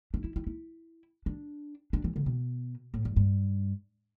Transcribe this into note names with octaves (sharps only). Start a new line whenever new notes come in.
D4
E4
E4
E4
D4
D4
E3
D3
B2
A2
G2
G2